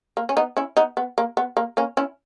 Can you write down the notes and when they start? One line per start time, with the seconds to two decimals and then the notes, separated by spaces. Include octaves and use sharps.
0.17 A#3
0.29 C#4
0.37 B3 D#4
0.57 C#4 E4
0.77 B3 D#4
0.97 B3
1.18 A#3
1.37 B3
1.57 A#3
1.77 A#3 C#4
1.97 C#4 E4